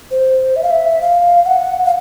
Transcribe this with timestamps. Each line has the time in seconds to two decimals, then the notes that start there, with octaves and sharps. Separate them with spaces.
0.11 C5
0.56 E5
0.63 F5
0.71 E5
1.01 F5
1.46 F#5
1.85 F5